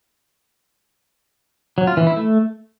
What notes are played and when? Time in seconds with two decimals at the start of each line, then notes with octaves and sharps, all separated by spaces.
1.78 F#3
1.87 F4
1.97 E3
2.07 E4
2.17 A3